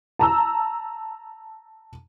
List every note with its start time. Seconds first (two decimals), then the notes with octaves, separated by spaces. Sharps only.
0.19 A5 A#5 E6